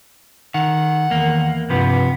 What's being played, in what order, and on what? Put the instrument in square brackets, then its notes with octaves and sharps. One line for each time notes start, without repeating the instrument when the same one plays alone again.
[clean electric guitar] D#3 [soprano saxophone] F#5
[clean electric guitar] E2 A#3 [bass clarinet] D#3
[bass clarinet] G2 [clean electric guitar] C3 F3 [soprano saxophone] B3